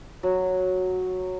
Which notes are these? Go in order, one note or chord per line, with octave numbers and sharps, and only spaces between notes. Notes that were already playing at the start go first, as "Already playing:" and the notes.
F#3